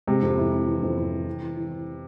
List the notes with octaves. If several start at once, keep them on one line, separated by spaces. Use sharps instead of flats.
C3 G#3
F2
E4
E4
E3
F2
E4
E3
E3
E3
E3